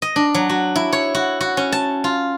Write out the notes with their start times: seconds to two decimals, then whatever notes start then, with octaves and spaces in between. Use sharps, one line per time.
0.02 D#5
0.16 D4
0.34 F#3
0.49 F#4
0.76 E4
0.93 C#5
1.15 F#4
1.41 F#4
1.57 C#4
1.72 A5
2.04 F4